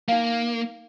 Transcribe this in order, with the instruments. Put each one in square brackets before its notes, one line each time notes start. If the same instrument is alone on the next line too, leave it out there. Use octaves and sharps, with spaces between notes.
[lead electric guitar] A#3 [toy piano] D#4 F5